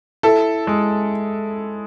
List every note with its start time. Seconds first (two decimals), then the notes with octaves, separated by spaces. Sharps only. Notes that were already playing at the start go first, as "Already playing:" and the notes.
0.23 E4 A4
0.67 G#3